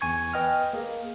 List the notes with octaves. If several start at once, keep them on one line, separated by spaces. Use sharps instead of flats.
E2 G#5 C#6 G#6
B4 D#5 G5 F6
A#3 G#4